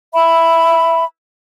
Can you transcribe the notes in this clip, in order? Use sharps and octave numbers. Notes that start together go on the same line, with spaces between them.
E5 B5